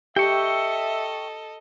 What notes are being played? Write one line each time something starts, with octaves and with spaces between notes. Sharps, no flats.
G4 A4 D#5 E5 G5 C#6